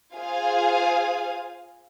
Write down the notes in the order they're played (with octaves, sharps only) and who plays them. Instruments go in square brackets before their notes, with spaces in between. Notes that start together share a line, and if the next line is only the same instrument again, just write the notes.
[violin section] F4 G#4 C5 F5 G#5